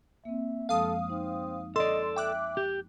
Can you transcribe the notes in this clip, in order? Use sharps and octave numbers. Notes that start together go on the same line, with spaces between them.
A#3 C4 E5
F#2 F3 G#3 A4 F5 D#6
C4 D#4
A4 D5 D#5 C6
E5 G5 D6 F#6
G4